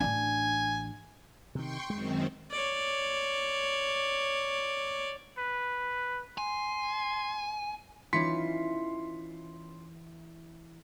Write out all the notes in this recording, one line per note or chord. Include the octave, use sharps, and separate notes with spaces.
A1 D4 G#5
C3 D#3 G5 C6 C#6
F#2 D#3 G#3 C4
C#5 D5
B4
G#5 C6
E3 C#4 D#4 F4 C6 B6 C#7